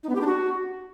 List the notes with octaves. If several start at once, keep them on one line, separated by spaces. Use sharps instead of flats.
D#4
B3
G4
D4
F#4